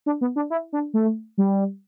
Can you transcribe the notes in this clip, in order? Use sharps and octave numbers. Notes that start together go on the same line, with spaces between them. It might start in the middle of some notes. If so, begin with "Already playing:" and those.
D4
B3
D4
E4
D4
A3
G3